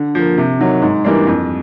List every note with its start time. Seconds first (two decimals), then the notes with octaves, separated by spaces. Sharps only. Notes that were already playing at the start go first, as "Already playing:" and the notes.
Already playing: D3
0.15 F3 A#3
0.38 C3
0.59 D#3 F#3
0.82 G#2
1.04 E3 G3 A#3 D4
1.27 F2